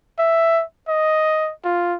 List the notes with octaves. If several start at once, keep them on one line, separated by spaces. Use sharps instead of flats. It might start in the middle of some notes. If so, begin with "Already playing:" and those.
E5
D#5
F4